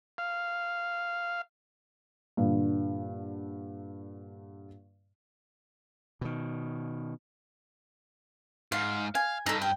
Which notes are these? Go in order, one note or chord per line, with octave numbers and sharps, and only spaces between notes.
F5
G2 A#2 D3
B2 D#3
G#2 F5
F5 G#5
G2 D#4 A4
G5